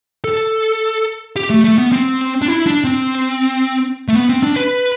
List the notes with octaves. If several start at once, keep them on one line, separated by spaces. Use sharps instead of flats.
A4
G4
A3
A3
B3
C4
D4
E4
D4
C4
A3
B3
C4
D4
B4